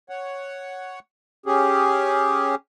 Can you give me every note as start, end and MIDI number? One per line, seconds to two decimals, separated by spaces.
0.09 0.99 73
0.09 0.99 78
1.46 2.55 61
1.46 2.55 67
1.46 2.55 68